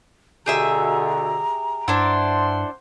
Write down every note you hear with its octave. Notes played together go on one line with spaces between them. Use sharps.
D2 B2 D3 G4 G#4 E5 A#5
G2 D4 E4 C5 F#5 C6